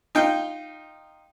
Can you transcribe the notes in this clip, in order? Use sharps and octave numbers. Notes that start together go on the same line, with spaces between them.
D#4 F4 G5